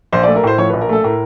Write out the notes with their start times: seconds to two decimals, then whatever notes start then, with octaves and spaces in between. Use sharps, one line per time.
0.12 A#1 C5
0.23 D5
0.27 A3
0.36 A#4
0.43 A2 C5
0.58 F3 C#5
0.70 B4
0.73 A#1
0.81 A#4
0.89 A3 A4
1.04 A2 A#4